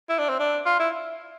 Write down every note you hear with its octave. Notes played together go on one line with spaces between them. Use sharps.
E4
D4
C4
D4
F4
E4